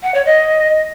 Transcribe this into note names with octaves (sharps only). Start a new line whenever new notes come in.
F#5
C#5
D#5